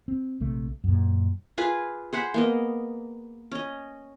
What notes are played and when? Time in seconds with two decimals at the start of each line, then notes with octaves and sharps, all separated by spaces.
0.08 C4
0.40 A#1 C3 A3
0.84 F#2 A#2
1.58 F4 G#4 B4 G#5
2.13 G#4 C5 F#5 B5
2.34 A#3 B3 D#5
3.51 C#4 D#5